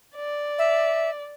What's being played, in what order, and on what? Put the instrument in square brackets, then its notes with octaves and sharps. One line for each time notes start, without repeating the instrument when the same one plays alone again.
[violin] D5
[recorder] E5